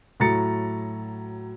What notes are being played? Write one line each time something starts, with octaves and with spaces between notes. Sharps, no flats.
A2 F#3 A#5 A6 C#7